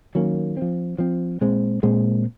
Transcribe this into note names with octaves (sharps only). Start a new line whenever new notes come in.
D#3 F#3 A#3 C#4
F3 C4
F3 C4
A#2 G#3 C4
A#2 G#3 C4